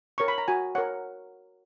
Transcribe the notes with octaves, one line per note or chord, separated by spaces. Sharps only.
A#4 C#5 C#6
B5
A#5
F#4 G#5
A#4 C#5 F#5